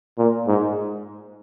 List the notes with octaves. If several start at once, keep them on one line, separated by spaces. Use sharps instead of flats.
A#2
G#2